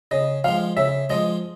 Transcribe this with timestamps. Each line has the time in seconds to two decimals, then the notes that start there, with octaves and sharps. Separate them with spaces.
0.11 C#3 D#5
0.44 F3 G#3 F5
0.76 C#3 E5
1.10 F3 G#3 D#5